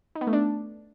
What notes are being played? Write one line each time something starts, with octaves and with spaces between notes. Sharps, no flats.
D#4
B3
A3
D4